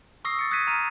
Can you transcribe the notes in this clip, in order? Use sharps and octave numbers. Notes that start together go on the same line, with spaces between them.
C#6 D#6 E6 A#6 C7
A6 C#7
D#6 F#6 G#6 A#6 B6 D#7
A#5 F6 D#7